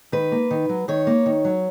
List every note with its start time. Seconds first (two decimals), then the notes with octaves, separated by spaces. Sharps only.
0.12 D#3 B4
0.32 A#3
0.51 D#3
0.69 F#3
0.88 D#3 C#5
1.07 A#3
1.26 D#3
1.45 F#3